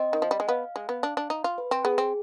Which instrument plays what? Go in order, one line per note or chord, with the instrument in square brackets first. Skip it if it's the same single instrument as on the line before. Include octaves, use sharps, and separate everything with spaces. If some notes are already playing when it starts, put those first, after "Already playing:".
Already playing: [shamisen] C4 [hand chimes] D#5
[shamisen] D#3
F3
G3
G#3
[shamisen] B3 [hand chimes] F5
[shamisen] G#3
B3
D4
D4
D#4
F4
[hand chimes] B4
[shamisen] C4
[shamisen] B3 [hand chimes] G#4
[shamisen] C4